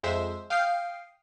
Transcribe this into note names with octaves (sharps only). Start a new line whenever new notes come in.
F2 G#3 C5 E5 E7
F5 G5 D#6 F6 C7